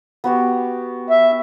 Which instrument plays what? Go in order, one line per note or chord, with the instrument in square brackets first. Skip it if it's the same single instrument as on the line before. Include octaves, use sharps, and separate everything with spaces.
[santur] B3 F#4 G4
[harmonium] E5